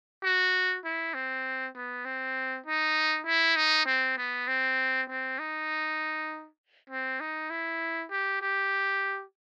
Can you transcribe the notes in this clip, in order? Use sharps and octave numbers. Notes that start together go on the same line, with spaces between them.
F#4
E4
C4
B3
C4
D#4
E4
D#4
C4
B3
C4
C4
D#4
C4
D#4
E4
G4
G4